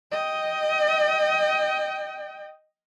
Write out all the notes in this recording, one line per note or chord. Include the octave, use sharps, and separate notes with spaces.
D#5 G5